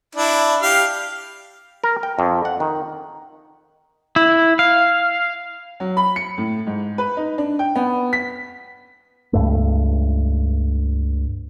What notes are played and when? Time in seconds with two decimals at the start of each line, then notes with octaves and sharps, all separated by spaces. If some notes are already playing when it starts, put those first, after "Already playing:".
0.15 D4 E4 D5
0.62 G4 F5
1.84 A#4
2.03 G5
2.19 F2
2.45 F#5
2.60 D#3
4.16 E4
4.59 F5
5.80 F#3
5.97 B5
6.16 C#7
6.38 A2
6.67 G#2
6.98 B4
7.17 D#4
7.38 D4
7.59 G5
7.75 B3
8.13 B6
9.33 C#2 G2 A3